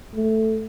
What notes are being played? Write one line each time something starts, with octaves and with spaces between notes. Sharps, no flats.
A3